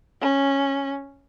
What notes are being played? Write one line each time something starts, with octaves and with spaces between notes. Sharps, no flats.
C#4